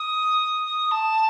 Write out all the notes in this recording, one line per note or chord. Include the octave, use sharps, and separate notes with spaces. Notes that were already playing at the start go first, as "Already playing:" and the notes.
Already playing: D#6
A5